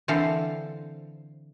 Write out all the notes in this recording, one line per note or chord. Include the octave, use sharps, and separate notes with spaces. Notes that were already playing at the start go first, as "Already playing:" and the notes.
D3 E3 C4 A4 F5